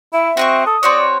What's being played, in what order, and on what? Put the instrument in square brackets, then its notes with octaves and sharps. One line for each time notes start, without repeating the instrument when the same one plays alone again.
[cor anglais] E4 [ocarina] E5
[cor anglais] C4 [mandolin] F#4 D#5 C#6
[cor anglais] A4 [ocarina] D#6
[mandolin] C4 F#4 C#5 [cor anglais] D5